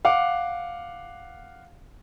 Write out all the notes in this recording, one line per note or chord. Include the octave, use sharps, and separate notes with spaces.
F5 F#5 D6